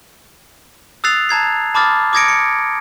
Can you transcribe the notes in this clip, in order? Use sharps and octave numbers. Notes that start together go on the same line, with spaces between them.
D#6 E6 F#6 A6 C7 F7
A5 A#5 G#6 C7
A5 B5 D6 D#6 F6 A6
D6 D#6 G#6 A#6 C#7 D7
C#7